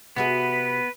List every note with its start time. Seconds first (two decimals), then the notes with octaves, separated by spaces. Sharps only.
0.16 C3 B3 F#4 G#4 B4